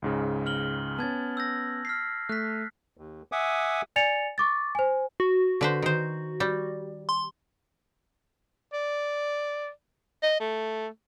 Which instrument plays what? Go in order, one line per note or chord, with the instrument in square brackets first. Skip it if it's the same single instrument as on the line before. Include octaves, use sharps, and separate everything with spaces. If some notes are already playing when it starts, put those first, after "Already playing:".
[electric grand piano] C#2 G#2 C#3
[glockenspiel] F6 F#7 G7
[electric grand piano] B3 C#4 [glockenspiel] A5 G#6 A6
[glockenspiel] E6 G6 A#6
F6 B6 C7
[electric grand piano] A3 [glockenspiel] F#6 B6
[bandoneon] D#2
E5 F#5 G#5 D6 D#6
[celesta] D5 G#5 A6 C#7 F7
C#6 D6 A6
C5 G#5
[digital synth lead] F#4
[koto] D3 B4 C5
D#3 C5
G3
[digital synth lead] C6
[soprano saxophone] D5
D#5
A3